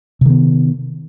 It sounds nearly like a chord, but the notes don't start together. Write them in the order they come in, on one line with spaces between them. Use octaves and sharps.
C3 D#3 B3